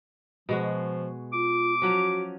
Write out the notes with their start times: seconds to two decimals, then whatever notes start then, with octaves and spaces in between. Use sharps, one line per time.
0.49 B2 F3 G#3 F#4
1.33 F4 D6
1.82 F3 F#3 C#4 F#4